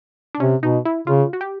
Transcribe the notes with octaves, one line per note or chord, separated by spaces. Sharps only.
D4
C3 C#4
B2 D#4
E4
C#3 F4
F#4
G4